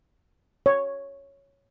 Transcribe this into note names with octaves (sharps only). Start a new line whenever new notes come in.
C#5